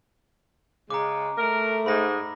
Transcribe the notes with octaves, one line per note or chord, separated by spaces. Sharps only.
C#3 G#3 A#5 D6
A3 A#4
G#2 B5 A#6